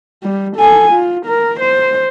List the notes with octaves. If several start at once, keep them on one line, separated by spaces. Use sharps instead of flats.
G3
A4 G#5
F4
A#4
C5